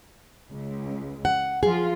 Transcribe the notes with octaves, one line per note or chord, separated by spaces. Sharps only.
C#2
F#5
F3 F4 G#4